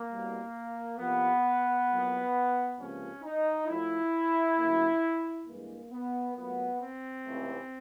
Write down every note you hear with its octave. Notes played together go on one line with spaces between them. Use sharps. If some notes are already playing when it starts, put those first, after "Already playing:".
Already playing: A#3
C2 B2 G3
F2 C3 F3 A#3 B3
C2 A#2 F#3 A#3
C#2 C3 F3 A#3 C#4
D#4
A2 F3 A3 E4
D2 C#3 F#3 A#3
G2 E3 G#3 A#3
B3
A#2 F#3 A3 B3
C4
C#2 C3 E3 A3